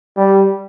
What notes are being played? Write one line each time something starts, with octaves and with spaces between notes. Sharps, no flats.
G3